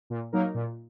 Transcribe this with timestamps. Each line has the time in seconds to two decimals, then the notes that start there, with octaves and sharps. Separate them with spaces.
0.10 A#2
0.32 F#3 A#3 D#4 A#4
0.54 A#2